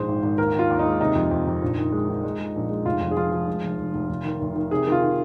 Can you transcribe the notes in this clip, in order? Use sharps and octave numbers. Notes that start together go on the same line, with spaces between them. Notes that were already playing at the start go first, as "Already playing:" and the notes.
Already playing: A#1 G#2 G#3 C5
G#1
G#1
D#2 A#4
D#2 F4
D#2
D#4
G#3
C3 D#4
F2
F2
F2
A#1
D#3
G#3
D#3
G#3
G#3
A#1
G#3
F1 F4
F2
G#4
F3 F4
F3
G#3
F1
F1
F1
F1
D#3
F1
D#3
C3 G#4
D#3
F4
D#3